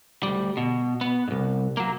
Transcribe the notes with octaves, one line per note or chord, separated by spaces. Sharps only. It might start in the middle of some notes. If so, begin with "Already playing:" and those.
D2 G3
B2
B3
C2 G#2
F#3 A#3